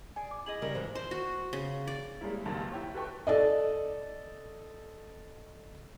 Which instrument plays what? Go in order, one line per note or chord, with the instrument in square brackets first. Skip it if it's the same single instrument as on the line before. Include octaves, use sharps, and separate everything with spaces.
[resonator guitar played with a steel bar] G#4 D5 [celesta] G#5
[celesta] D6
[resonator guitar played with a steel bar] E4 G#4 D#5 [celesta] F#7
[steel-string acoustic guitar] C#3 G3 A#4
[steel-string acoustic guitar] F2 G#2 E3 [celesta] C5
[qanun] C5
F#4
C#3
D5
[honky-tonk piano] G3 G#3 A#3 E4
C#2 F#2 C3 D#3 A#3 A5
E4 G4 C#5
F#4 A4 B4 G5 C#6
[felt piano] A4 D5 D#5